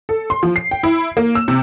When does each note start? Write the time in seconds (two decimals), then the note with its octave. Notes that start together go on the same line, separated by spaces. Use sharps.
0.09 A4
0.30 C6
0.43 F3
0.56 C7
0.71 G5
0.83 E4
1.17 A#3
1.35 E6
1.48 C3